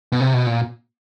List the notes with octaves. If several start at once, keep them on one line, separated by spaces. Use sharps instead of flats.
B2
C3
B2
A#2